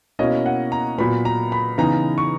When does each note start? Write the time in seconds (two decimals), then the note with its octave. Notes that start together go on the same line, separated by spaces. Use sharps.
0.19 B2 A#3 C#4 E4 D#5
0.46 F#5
0.72 A#5
0.98 A#2 F#3 B3 B5
1.25 A#5
1.52 B5
1.78 C#3 E3 B3 D#4 A#5
2.18 C#6